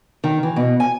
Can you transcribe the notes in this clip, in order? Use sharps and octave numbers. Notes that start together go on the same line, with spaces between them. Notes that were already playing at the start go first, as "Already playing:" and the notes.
D#3
E3
B2
G#5